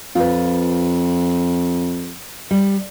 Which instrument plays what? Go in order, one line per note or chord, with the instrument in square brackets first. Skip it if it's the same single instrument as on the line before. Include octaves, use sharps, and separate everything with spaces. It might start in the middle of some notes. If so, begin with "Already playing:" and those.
[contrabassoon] F2 [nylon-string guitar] F4 B4
[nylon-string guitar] G3